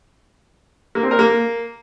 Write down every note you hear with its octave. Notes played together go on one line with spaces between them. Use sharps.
A#3
C4
A#4
A#3